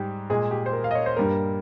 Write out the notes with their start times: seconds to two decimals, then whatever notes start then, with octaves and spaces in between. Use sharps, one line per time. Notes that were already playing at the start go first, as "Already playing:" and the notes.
Already playing: G#2 G3 G4
0.30 A#2 G#3 G#4
0.51 G4
0.66 C5
0.73 A#4
0.84 F5
0.91 D#5
0.95 C#5
1.06 C5
1.17 G2 G3 A#3 A#4